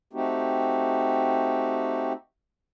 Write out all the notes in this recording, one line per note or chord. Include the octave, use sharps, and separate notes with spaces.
A3 C4 D#4 F#4 G4